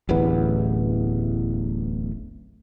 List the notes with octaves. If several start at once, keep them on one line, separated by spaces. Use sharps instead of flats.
D1 A1 E2 B3